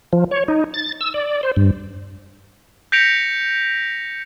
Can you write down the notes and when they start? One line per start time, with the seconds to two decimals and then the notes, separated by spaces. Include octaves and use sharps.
0.13 F3
0.31 C#5
0.48 D#4
0.74 A6
1.01 E6
1.14 D5
1.43 C5
1.56 G2
2.92 G6 A#6 B6 C#7 D7 F7